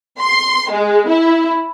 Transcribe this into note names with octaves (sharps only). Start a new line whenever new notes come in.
C6
G#3
E4